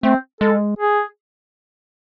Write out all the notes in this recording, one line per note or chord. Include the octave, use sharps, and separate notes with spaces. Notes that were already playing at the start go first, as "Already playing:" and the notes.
A3 C4
G#3 A4
G#4